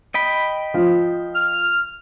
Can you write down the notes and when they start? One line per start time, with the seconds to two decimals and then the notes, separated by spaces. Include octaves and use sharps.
0.14 D#5 G5 B5
0.74 F3
1.35 F6